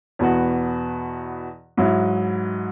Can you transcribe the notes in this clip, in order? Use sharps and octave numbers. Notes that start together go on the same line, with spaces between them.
E2 B2 B3 F#4
G#2 F#3 E4